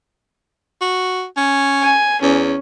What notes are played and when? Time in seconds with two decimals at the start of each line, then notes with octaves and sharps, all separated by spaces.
0.81 F#4
1.37 C#4
1.82 G#5
2.22 E2 C#4